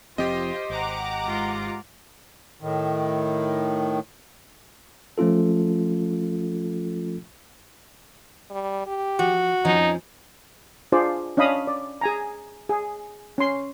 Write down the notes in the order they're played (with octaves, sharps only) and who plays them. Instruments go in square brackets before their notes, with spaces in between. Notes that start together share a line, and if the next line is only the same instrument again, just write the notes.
[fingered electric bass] F1 F3 C4 [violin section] F4 [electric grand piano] G4 D#5 [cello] C5
[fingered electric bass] G#1 [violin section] F#5 A#5 D6
[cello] G#2 F4
[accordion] A2 D#3
[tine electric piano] F3 A3 C#4 F4 A4
[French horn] G3
G4
[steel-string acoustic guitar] F3 [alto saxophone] F#4
[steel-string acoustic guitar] F2 F3 C#4 [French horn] D#4
[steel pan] D4 F4 G#4 C5 D5
C#4 D4 D#5 F5 B5 D#6
D5
G#4 G#5 A#5
G#4
C#4 C6